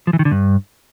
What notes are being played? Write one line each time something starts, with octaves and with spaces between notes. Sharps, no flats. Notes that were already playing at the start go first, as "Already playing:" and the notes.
F3
E3
D#3
D3
G2